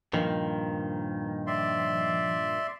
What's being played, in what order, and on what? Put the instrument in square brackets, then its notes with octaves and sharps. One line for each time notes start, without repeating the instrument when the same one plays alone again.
[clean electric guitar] G2 A#2 D#3 [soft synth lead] F3
[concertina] D5 E5 C6